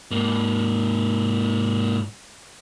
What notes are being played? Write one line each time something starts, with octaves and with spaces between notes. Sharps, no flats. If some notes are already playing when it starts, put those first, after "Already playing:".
G#2 A#3